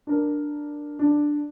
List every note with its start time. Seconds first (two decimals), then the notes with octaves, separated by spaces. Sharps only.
0.07 D4 A#4
0.99 D4